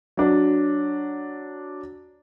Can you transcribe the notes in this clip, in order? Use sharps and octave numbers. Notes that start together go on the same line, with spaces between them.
F#3 D4